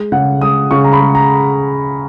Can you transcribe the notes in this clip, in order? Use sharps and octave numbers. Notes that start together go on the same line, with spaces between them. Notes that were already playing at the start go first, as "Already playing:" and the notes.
Already playing: G#3
C#3 F#5
G#3 D#6
C#3 C#6
A#5
B5
G#3
A#5